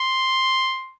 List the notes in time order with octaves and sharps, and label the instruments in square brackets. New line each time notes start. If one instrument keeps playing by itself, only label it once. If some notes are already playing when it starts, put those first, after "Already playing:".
Already playing: [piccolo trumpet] C6